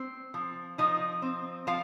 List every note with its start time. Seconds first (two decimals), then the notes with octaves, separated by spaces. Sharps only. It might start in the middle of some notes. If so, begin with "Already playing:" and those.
Already playing: C4
0.34 F3
0.78 F3 D#4 D#5
1.22 C4
1.67 F3 F4 F5